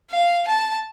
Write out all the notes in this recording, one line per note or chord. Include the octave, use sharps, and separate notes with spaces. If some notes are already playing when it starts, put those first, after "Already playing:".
F5
A5